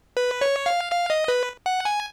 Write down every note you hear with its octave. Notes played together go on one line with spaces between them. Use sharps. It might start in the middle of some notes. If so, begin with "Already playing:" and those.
B4
C#5
F5
F5
D#5
B4
F#5
G#5